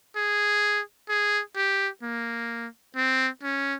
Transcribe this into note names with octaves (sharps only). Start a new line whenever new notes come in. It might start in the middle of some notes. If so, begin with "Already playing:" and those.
G#4
G#4
G4
A#3
C4
C#4